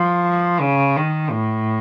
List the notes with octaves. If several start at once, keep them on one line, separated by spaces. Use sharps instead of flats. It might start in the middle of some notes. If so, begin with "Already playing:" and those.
Already playing: F3
C#3
D#3
A2